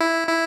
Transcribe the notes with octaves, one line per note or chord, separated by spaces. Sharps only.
E4
E4